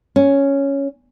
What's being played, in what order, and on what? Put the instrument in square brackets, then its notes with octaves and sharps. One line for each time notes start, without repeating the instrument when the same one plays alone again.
[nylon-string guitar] C#4